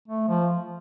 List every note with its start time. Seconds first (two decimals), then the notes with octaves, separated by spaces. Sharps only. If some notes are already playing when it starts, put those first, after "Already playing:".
0.08 A3
0.28 F3